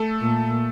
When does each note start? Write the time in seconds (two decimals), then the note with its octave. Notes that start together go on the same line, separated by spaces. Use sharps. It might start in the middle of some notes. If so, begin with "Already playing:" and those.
Already playing: A3 A4
0.20 A#2